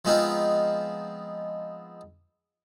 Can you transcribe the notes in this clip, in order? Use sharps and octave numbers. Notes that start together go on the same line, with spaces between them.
F3 G#3 B3 C4 D#4 F4